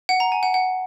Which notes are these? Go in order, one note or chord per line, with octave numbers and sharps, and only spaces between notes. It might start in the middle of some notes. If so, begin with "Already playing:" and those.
F#5
A#5
G#5
F#5
F#5